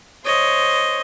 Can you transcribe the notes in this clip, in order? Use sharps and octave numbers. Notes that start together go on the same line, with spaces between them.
C5 C#5 D#5